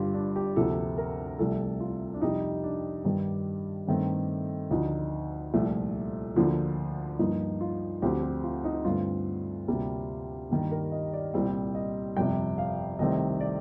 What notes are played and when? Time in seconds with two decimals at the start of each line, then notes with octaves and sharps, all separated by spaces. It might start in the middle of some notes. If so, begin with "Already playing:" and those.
Already playing: G1 G2 D3 F4 G4
0.14 D4
0.36 G4
0.56 D2 C3 F3 A#3 A4
0.98 A#4
1.39 C2 C3 F3 A3 C4 A4
1.80 F4
2.14 D4
2.22 F2 C3 G3 D#4
2.63 D4
3.05 G2 D#3 G3
3.88 G2 D#3 A3 C4
4.71 D2 D3 F3 D#4
5.54 C2 A#2 F3 A3
6.36 D2 D3 F3 A#3
7.19 G2 F3 A#3 D#4
7.61 F4
8.02 D2 D3 F3 A3 C4 G4
8.23 G4
8.43 F4
8.64 D#4
8.85 G2 D3 A3 C4 F4
9.68 D2 C3 G3 A#3
10.51 G2 D#3 G3 A#3 G4
10.71 A#4
10.92 D#5
11.13 D5
11.34 C2 A#2 G3 C4 C5
11.75 D#5
12.16 G1 F2 C3 G5
12.58 F5
12.99 C2 C3 D#3 A3 C4 D#5
13.41 D5